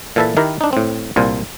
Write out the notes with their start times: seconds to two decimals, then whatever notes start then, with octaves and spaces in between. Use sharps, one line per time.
0.16 A#2 E3 A4 B4 E5 A5
0.37 D#3 E4 G4 A#4
0.61 D4 D#4
0.73 A2 C4
1.16 C2 A#2 F4 C5